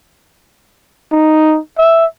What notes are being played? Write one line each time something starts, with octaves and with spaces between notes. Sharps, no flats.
D#4
E5